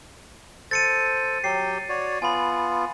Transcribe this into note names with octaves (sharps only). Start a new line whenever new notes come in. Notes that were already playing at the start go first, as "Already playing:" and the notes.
A4 C5 A6 C#7 D#7
F#3 G4 G5 C7
F#4 C#5 D5
B3 F4 G#5 B5